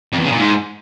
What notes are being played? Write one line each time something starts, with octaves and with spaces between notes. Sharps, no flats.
F2
E2
C#3
A#2
G#2